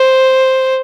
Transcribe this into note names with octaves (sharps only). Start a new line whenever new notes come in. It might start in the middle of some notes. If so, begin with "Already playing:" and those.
Already playing: C5